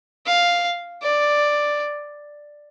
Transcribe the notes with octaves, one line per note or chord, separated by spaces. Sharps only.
F5
D5